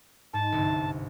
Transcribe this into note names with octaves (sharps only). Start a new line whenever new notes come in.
G#2 A5
G1 C2